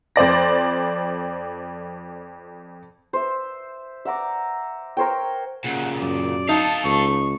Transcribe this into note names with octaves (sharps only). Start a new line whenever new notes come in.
F2 C5 D5 A#6
C5 E5
E5 F#5 A#5 D6
A#4 C5 C#5 G5
A#2 C#3 F#5
F#2 D5
D#4 A4 F5 A5
C#2 C#6